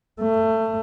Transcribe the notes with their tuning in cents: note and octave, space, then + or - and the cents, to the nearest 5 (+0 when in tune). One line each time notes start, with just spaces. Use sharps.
A3 +20